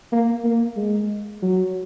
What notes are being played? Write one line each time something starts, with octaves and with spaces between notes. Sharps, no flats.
A#3
A#3
G#3
F#3